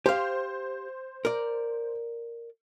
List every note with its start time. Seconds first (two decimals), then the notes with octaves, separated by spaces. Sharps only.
0.06 G4 C5 F5
1.25 A#4 D5